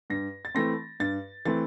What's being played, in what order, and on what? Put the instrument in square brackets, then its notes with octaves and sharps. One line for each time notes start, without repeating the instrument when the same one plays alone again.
[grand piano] G2 A#6
A6
E3 A3 C4 A#6
G2 A6
E3 A3 C4 A6